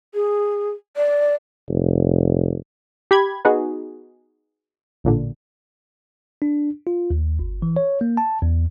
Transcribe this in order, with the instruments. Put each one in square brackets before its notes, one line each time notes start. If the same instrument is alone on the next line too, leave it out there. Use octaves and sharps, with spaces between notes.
[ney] G#4
D5
[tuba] F1
[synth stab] G4 B5 G#6
B3 D#4 F#4 G#4
A1 A#2 D3
[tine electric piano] D4
F4
D#2
G1
E3
C#5
A#3
A5
E2